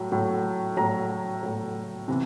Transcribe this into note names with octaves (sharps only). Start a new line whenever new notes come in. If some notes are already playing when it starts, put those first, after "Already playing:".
Already playing: A2 F#3
A2 F#3
A2 F#3 A#5
A2 F#3
C3 E3